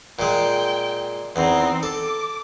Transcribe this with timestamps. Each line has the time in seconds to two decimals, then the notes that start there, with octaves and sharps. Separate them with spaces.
0.19 A#2 G#3 G5
1.36 E2 C4 D#4
1.83 A4 D6